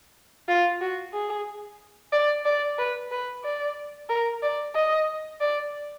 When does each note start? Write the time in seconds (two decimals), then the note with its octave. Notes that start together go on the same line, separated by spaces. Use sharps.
0.48 F4
0.81 F#4
1.14 G#4
2.13 D5
2.45 D5
2.79 B4
3.11 B4
3.44 D5
4.10 A#4
4.43 D5
4.75 D#5
5.41 D5